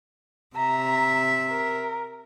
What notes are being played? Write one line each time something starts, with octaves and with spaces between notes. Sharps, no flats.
C3 E5 A#5
A#4